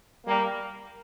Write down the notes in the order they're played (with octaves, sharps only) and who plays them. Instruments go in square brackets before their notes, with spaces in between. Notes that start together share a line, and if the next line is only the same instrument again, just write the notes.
[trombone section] G3 A#3